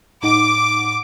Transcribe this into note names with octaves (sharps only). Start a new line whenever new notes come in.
A2 D#4 F#5 D6